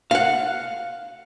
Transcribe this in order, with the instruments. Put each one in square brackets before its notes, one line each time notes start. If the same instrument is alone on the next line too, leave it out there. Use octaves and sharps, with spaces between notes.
[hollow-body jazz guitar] F5 F#5